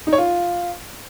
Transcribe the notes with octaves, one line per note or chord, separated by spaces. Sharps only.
D#4
C#5
F4